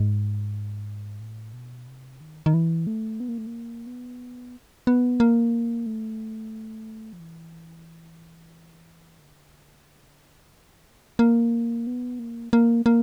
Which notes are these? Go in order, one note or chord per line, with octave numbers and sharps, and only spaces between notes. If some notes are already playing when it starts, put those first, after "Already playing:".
Already playing: G#2
A2
B2
C3
D#3
D#3
E3
A3
B3
A#3
A3
A#3
B3
B3
A#3
A3
F3
E3
D3
E3
A#3
A#3
B3
A#3
A#3
A#3